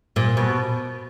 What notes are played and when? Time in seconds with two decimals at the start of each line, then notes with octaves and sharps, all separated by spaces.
0.16 A#2
0.37 B2